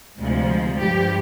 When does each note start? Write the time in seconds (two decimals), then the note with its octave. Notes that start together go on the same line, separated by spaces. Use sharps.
0.18 D2 C3 F3 G#3
0.49 G#3
0.80 G2 F3 G4